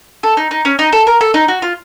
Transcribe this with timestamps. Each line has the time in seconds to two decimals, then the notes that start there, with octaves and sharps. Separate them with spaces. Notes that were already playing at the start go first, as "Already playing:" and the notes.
0.23 A4
0.37 D#4
0.51 D#4
0.65 C#4
0.79 D#4
0.93 A4
1.07 A#4
1.21 A4
1.34 D#4
1.48 F#4
1.62 F4